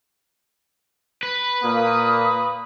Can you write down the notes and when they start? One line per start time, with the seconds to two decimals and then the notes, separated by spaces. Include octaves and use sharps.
1.23 B4
1.63 A#2 A#3 D#6